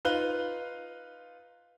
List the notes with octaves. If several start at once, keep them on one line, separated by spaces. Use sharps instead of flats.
D#4 F4 B4 F5 F#6 G7